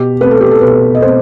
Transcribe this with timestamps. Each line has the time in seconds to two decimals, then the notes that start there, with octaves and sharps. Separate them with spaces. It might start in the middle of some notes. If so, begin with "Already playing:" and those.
Already playing: B2 G4
0.21 A3 C4 B4
0.31 A4
0.41 G4
0.51 A4
0.61 B2 B4
0.95 D#5
1.02 A3 C4 C5